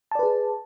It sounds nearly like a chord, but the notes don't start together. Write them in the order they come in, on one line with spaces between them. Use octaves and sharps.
A5 D5 B4 G#4